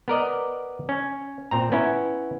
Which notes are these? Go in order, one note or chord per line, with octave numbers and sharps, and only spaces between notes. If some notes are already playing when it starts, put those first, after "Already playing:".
B3 A#4 D5 D#5
C#4
A#2 C4 A#5
B3 C#4 E4